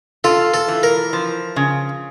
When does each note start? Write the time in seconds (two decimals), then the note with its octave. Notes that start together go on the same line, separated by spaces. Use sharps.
0.24 F4 A4
0.54 A4
0.68 E3
0.83 A#4
1.13 F3
1.56 C#3